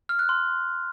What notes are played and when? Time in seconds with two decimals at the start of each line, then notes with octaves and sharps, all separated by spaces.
0.09 F6
0.19 F#6
0.29 C6